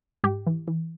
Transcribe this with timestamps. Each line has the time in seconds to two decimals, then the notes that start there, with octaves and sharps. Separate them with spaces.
0.24 G#2 G4
0.47 E3
0.68 E3